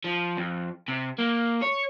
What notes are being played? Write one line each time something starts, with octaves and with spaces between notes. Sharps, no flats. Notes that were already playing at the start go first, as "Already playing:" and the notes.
F3
F2
C3
A#3
C#5